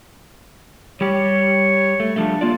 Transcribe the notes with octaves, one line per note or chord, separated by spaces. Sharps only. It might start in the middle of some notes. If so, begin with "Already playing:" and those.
G3 G4 C#5
A3
F3 G3 A3 D4
A#3 F4 D5